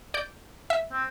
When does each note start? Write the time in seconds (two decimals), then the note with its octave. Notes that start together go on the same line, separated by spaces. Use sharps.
0.14 D5 G6
0.70 E5
0.93 C4